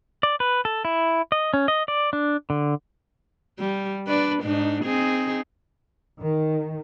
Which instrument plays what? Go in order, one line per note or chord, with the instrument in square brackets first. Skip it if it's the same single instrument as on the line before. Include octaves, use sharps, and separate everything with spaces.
[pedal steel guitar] D5
B4
A4
E4
D#5
C#4
D#5
D5
D4
D3
[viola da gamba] G3
D4 B4 D5
G#2 D4 D#4
C4 D#4 G#4
[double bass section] D#3